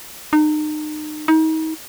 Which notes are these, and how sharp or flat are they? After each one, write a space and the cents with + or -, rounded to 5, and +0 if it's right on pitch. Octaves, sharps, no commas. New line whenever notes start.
D#4 -35
D#4 +35